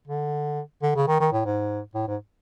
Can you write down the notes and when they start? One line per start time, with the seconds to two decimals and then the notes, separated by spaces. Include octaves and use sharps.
0.08 D3
0.83 D3
0.96 C#3
1.08 D#3
1.20 D#3
1.33 A2
1.45 G#2
1.95 A2
2.08 G#2